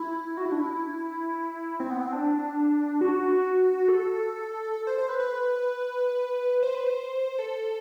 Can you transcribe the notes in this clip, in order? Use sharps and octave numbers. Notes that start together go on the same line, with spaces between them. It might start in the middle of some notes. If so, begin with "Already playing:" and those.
Already playing: E4
F#4
E4
D4
E4
C4
B3
C4
D4
F#4
A4
C5
C5
B4
B4
C5
B4
C5
A4